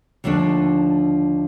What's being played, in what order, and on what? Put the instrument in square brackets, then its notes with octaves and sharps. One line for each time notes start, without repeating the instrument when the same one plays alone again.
[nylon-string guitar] D#2 D3 F3 A3 D4